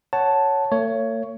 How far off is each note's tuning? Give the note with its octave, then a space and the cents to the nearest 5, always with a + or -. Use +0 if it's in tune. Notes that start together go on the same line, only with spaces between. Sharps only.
C#5 +0 F#5 +10 A5 +0
A3 +45 C#5 +10